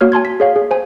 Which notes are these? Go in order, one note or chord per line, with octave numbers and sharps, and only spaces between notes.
A#3 F#4 C#5 F6
G#5 A5 C6 G#6
B6
G#4 C#5 F5
G#4
C5 G#5